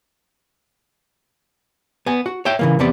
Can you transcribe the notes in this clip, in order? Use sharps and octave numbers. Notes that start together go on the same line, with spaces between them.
B3 G#5
F#4
C#5 E5 G5
C#3 E3 A#3
E2 C3 B3 D5